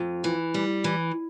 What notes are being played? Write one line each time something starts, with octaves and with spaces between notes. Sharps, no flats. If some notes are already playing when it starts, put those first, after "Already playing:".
Already playing: F2
E3
G3
E3